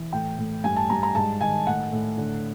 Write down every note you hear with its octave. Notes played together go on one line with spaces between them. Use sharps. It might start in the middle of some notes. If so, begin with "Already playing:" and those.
Already playing: E3
A2 G5
A2
G2 G#5
A5
G2 A#5
A#5
G#2 A5
D#3 G#5
A2 F#5
A2
D3